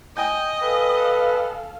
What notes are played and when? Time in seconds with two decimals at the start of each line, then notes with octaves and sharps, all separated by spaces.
0.17 D#5 G5 G#5 G6
0.62 A4 B4 F5